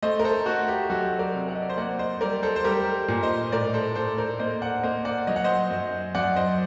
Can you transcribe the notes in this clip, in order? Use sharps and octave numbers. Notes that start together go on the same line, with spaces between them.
A3 C5 D#5
A#4
A4 C5
A3 F#4
G4
F#3 F#4 A4
A#4 D5
C3
F#5
D#5
D5
C5 D#5
A#3 D5 F#5
C5 D#5
G3 A#4 D5
A4 C5
C5
G3 G4 A#4
A#2
C5 D#5
A2 A#4 D5
A4 C5
A2 A4 C5
A#4 D5
A#3 C5 D#5
D5 F#5
A#3 C5 D#5
D5 F#5
F#3 D#5
F#5
C5 D#5
F#2
F#2 D5 F#5
C5 D#5